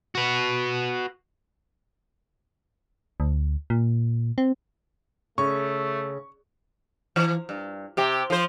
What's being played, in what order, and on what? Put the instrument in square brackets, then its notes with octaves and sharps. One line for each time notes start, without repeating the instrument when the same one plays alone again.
[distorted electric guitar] F#4 B4
[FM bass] D2
A#2
C4
[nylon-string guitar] C#3 [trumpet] A3 [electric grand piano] C#6
[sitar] E3
G2
C3 G4
F3 C5